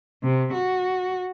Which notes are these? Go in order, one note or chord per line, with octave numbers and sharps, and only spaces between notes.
C3
F#4